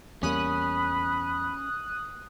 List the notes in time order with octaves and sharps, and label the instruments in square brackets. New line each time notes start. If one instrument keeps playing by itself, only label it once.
[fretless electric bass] E2 G3 A#3 [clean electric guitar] C#4 [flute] B5 [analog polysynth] D#6 F#6